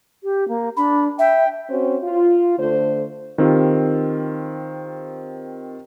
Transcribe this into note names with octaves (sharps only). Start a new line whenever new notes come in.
G4
A#3
D4 B5
E5 G5
C4 C#4 F#4 C5
F4
D3 A3 C5
D#3 C4 F4 G4